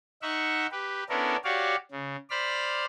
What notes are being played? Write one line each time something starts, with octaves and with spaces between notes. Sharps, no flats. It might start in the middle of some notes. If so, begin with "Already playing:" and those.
D#4 E5 F#5 C#6
G4 B4
B3 C#4 D4 E4 A4 A#4
F#4 G4 C#5 D5 F5
C#3
C5 D5 B5 F6